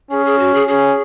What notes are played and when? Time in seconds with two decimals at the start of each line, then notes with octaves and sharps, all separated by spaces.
0.11 C#4 G#4
0.26 G#4
0.39 F#4
0.54 G#4
0.68 C#4 G#4